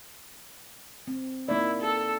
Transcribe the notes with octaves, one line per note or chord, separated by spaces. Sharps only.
C4
A#3 D#4 E4 D5
A4